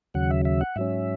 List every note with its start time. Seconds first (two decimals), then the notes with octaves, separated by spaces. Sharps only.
0.14 D#2 C#3 F#3 F#5
0.31 E5
0.45 E5
0.61 F#5
0.76 G#2 F#3 C#4 E5